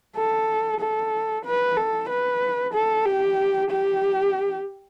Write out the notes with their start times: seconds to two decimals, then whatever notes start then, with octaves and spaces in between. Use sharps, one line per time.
0.17 A4
0.81 A4
1.45 B4
1.77 A4
2.09 B4
2.74 A4
3.06 G4
3.70 G4